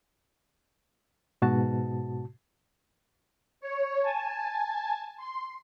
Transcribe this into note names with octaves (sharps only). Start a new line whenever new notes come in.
G#2 B2 F#4 A5
C#5
G#5 A5
C6